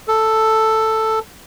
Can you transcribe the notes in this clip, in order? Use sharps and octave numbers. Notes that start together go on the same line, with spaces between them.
A4